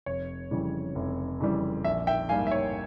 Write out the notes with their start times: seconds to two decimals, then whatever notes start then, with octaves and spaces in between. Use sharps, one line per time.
0.06 F1 C#5
0.51 F2 C#3 E3 G3
0.95 F1
1.40 F2 C#3 E3 G3
1.84 A#1 E5
2.07 E5 G5
2.29 G#2 G3 A#3 F5 G#5
2.47 E5
2.51 C#5